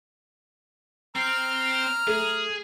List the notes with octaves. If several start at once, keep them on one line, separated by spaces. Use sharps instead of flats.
C4 A#5 F6
A3 G#4